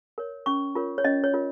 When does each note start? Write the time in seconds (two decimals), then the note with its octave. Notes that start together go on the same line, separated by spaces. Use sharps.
0.18 A#4 C#5
0.46 C#4 C#6
0.75 F4 A#4 C#5
0.98 C#5
1.04 C#4 D#5
1.24 C#5
1.34 F4 A#4 C#5